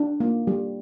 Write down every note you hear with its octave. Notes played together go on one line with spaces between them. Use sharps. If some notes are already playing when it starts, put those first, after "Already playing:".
Already playing: D4
A#3
G3